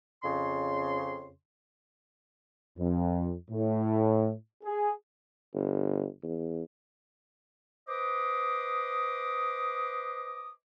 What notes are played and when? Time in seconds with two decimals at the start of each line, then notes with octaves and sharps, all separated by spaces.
0.24 F2 C#3 C6
2.78 F2
3.51 A2
4.64 G#4
5.54 G1
6.23 E2
7.87 B4 C5 D#5 D6 D#6